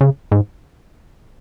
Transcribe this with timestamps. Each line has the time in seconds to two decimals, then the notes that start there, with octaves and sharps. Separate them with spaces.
0.01 C#3
0.32 G#2